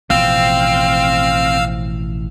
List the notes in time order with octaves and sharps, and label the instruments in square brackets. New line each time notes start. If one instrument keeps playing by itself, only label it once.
[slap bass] A1 B2 F3 [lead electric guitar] C4 [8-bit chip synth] F5 E6 F6